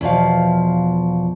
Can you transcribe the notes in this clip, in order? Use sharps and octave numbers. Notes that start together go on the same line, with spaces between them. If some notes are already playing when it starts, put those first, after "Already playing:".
E2 B2 F3 F5